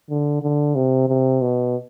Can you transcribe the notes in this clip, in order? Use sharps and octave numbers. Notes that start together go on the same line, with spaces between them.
D3
D3
C3
C3
B2